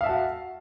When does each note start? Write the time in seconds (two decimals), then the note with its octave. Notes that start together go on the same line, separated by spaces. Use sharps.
0.01 F5
0.03 E5
0.06 A5
0.09 F#4